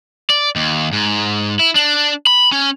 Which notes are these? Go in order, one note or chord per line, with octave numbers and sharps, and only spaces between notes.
D5
D#2
G#2
E4
D4
B5
C#4